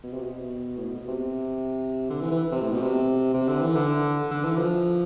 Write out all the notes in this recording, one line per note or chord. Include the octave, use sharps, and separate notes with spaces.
B2
C3
B2
A2
B2
C3
D3
E3
E3
C3
A2
B2
C3
C3
D3
E3
D3
D3
E3
F3